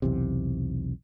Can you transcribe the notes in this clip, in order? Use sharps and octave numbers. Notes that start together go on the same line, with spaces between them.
B1 E2 C3